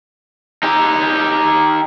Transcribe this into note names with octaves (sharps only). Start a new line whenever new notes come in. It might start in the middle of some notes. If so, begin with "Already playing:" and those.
D#4 G4